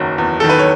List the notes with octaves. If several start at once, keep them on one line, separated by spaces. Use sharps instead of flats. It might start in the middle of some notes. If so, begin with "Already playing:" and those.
Already playing: F#1 E2 D#3 F#3
E2
D#3 A4
B4
C#5